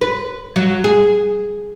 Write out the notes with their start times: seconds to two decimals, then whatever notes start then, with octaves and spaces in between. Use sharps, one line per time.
0.01 B4
0.56 F#3
0.84 G#4